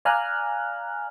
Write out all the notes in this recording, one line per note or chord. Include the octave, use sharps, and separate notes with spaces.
D5 F5 G#5 A#5 F6 F#6